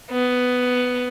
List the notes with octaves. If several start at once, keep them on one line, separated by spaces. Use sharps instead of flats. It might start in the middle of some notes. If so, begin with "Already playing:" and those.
B3